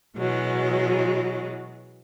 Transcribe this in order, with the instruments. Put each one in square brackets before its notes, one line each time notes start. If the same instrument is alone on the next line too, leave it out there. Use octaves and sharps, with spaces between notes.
[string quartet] B2 E3 F#3 G#3